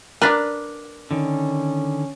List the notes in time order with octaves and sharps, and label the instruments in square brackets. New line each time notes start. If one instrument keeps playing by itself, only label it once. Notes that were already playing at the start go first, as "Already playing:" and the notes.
[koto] D4 B4 [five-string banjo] A#4 D5
[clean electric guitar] D3 D#3 [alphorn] C#4